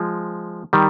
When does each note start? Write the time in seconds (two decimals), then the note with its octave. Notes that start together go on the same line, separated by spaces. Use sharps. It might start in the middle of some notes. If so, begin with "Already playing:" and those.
Already playing: F3 G#3
0.73 D#3 G3